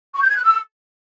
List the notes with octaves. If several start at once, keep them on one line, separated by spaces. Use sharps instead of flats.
C#6
G6
G#6
F#6
E6